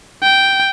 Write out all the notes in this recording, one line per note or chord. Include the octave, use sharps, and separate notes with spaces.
G5